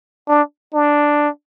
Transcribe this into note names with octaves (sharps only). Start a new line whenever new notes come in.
D4
D4